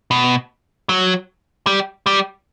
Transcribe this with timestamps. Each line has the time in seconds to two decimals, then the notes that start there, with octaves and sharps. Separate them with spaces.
0.11 B2
0.89 F#3
1.67 G3
2.06 G3